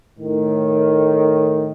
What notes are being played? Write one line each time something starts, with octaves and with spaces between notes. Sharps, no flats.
A2 D#3